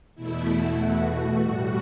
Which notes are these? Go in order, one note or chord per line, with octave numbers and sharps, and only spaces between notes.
E2 B2 A3 E4
F#4
A2 G3